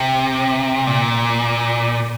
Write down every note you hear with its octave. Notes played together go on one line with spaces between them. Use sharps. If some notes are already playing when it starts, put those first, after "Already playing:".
Already playing: C3
A#2